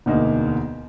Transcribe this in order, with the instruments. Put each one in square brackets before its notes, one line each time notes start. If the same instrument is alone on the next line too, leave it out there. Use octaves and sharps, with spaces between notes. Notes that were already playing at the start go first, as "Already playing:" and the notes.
[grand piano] E1 D2 A#3 D#4